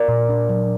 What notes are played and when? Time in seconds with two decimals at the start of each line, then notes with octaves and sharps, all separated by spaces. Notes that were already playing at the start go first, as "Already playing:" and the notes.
Already playing: A#4 D5
0.08 A#2
0.29 D4
0.49 F#3